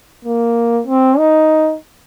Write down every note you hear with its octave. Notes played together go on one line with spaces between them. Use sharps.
A#3
C4
D#4